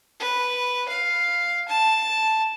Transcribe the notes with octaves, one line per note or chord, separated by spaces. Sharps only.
B4
F5
A5